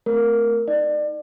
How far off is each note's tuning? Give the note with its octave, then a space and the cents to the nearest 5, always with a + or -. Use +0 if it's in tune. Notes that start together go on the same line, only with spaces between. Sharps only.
A3 +0 C4 -30 A#4 +0
D#4 +0 D5 +30